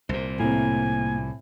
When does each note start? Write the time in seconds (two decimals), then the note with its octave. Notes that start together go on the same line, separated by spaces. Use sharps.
0.09 C2 A#2 C5
0.40 A2 C3 A#3 G#5